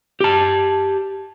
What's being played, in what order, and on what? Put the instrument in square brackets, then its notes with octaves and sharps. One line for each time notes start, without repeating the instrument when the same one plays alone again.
[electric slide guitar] G4 A5